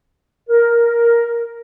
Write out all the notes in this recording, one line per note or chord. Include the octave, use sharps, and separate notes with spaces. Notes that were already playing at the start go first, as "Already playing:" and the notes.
A#4